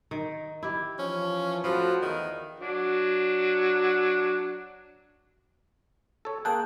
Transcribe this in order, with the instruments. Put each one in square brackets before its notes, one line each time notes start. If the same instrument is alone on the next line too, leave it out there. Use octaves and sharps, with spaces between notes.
[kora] D#3
E4 G4
[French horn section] E3 F3 [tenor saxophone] C#4
[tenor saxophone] F3 [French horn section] A3 F4 F#4 [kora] A4 B4
[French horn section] E2 [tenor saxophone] D#3
[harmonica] F#3 D4
[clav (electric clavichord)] A4 C#5
[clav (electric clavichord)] A#3 G#4 G5 [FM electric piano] A5 F#6